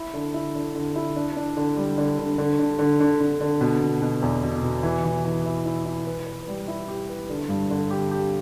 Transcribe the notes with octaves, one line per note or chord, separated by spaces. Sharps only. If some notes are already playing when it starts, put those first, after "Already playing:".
Already playing: E4
D3
E4
D3
D3
E4
D4
D4
D3
G3
D3
D3
D3
D3
D3
D3
D3
D3
B2
B2
B2
E2
B2
B2
E3
E3
E3
E4
E4
E4
B4
B4
G3
E4
G4
B4
D3
G2
D3
G4
G4